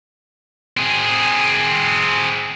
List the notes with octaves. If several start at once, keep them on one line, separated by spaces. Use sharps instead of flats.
C4 G#4